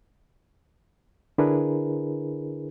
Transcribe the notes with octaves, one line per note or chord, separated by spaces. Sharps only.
D3 D4 E4 G#4 A#4 B4